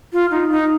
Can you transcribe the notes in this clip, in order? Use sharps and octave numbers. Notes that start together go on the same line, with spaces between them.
F4
D#4
D#4